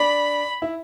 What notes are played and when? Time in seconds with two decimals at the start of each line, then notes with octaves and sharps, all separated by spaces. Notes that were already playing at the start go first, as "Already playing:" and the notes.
Already playing: D4 D5 B5
0.62 E4 E5